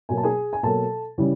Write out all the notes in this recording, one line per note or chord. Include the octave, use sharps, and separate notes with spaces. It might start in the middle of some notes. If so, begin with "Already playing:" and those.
B2 F#3 A#3 G#5
A5
G#4 G#5
G#5
B2 F#3 A#3 A4 A5
C#3 E3 G3